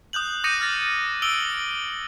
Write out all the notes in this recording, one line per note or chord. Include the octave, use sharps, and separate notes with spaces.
D#6 F#6 G6 F#7
D6 D#6 G6 A#6 C#7 D#7
F6 A6 A#6
D#6 E6 D7 F#7 G7